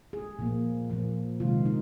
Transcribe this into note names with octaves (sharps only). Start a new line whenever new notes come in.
G#4
A#2 F3 A#3
A#2 F3 A#3
C3 D#3 G#3 F4
D#4